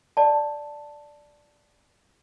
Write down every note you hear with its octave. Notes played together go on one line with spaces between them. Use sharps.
D5 A5